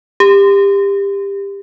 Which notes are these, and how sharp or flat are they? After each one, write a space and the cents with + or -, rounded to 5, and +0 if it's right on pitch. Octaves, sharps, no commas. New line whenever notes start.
G4 +25